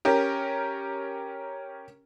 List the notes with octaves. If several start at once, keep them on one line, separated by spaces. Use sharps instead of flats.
C#4 G4 A#4